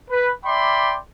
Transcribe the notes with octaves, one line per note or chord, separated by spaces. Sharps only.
B4
D5 E5 G5 B5 C6 D6